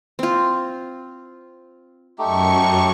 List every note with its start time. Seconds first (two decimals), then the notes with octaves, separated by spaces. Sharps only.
0.19 C4 F4
2.19 F#2 A3 D#4 G4 C#6